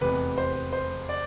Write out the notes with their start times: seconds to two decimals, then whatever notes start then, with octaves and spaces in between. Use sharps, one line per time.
0.01 F1 E2 C3 B4
0.38 C5
0.73 C5
1.09 D5